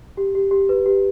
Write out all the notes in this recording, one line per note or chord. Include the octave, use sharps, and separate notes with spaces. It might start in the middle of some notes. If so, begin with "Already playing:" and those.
G4
G4
G4
B4
G4